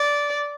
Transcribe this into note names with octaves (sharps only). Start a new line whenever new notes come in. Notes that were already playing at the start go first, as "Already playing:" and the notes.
Already playing: D5